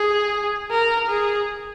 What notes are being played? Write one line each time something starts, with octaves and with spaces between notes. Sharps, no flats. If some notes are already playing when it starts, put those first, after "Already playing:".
Already playing: G#4
A#4
G#4